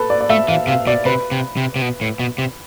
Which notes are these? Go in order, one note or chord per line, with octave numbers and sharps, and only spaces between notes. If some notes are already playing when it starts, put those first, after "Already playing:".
Already playing: A4 B4
D5
D5
A3 E5
E3 F5
C3 F5
B2 D5
C3 B4
C3
C3
C3
B2
A2
B2
C3